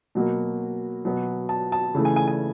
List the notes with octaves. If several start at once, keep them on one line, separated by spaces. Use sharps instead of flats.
B2 F#3 A#3
B2 F#3 B3
A5
A5
C#3 E3 A3
G#5
G#5
G#5